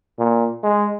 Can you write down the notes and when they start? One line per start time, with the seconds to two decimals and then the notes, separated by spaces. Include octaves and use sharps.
0.19 A#2
0.63 G#3